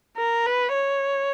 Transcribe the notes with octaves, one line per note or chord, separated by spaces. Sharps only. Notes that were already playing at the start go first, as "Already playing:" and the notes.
A#4
B4
C#5